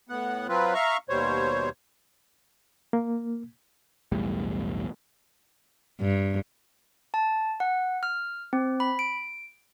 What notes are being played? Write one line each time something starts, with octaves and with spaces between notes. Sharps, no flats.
A2 B3 F#5
F#3 C4 F4 B4
E5 F5 A#5 C#6 F6
D#2 B2 G3 C5 C#5
A#3
B1 E2 A2 G3
G2
A5
F#5
F6
C4
B5
D7